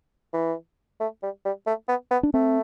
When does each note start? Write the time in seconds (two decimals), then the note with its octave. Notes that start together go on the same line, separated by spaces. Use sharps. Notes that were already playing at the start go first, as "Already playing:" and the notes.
0.33 E3
1.00 A3
1.23 G3
1.45 G3
1.67 A3
1.88 B3
2.11 B3
2.23 D4
2.34 A3 C4